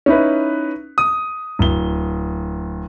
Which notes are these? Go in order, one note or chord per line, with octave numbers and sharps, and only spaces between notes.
C#4 D#4 E4 B4
D#6
D1 G7